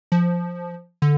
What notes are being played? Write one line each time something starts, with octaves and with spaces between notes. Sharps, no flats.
F3
D3